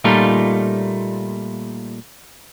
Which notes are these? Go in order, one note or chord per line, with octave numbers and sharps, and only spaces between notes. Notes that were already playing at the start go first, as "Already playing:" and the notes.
A#2 G3 A3 D#4 F4